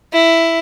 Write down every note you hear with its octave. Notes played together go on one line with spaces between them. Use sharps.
E4